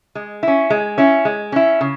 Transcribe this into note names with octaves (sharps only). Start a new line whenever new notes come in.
G#3
C#4 E4
G#3
C#4 E4
G#3
C#4 E4
C#3